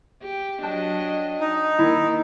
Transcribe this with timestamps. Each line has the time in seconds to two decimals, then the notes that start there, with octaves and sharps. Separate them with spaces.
0.22 G4
0.63 F#3 D4 D#5 G5 A5 F#6
1.40 D#4
1.79 D#3 A#3 E4